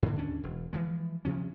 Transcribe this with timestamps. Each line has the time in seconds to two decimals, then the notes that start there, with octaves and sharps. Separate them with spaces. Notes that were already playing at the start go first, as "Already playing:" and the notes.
0.03 G#2 D3
0.18 D#2 C#4 D4
0.43 E1
0.73 E3 F3 G#3
1.25 D2 C3 F3 C#4